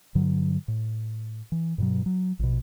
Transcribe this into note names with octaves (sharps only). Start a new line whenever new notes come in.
G2 D3 F#3
A2
E3
G2 B2 F#3
F#3
A#1 B2